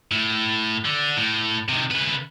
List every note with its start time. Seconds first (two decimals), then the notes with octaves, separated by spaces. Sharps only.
0.12 A2
0.85 D3
1.17 A2
1.69 C3 D#3
1.92 C#3 B4